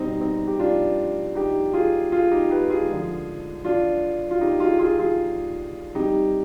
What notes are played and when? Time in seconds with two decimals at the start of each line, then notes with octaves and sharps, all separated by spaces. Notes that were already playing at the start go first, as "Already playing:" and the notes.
Already playing: B2 G3 C4 D#4
0.21 C4 D#4
0.47 G4
0.59 D4 F4
1.35 D#4 G4
1.73 F4 G#4
2.12 F4 G#4
2.31 D#4 G4
2.50 G4 B4
2.70 F4 G#4
2.89 D3 F3 G#3
3.65 D4 F4
4.31 F4
4.41 D#4 G4
4.60 F4 G#4
4.79 F4 G#4
4.99 F4 G#4
5.95 C3 G3 D#4 G4